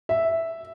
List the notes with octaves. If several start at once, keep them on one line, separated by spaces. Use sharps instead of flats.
E5